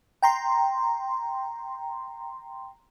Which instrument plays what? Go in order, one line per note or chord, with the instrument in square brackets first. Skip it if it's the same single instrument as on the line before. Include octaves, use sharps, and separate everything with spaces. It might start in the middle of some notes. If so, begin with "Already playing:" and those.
[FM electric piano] G5 A#5 C6